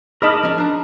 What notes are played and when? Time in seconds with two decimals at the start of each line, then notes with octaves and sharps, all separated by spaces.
0.22 D#4 G#4 A#4 D#5 A5 B5 D6 F6
0.43 F3 C#4
0.58 D4 A#5